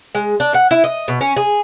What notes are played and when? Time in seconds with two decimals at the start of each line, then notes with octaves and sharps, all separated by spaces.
0.15 G#3
0.40 D4
0.54 F#5
0.71 E4
0.84 D#5
1.08 B2
1.21 C#4
1.36 G#4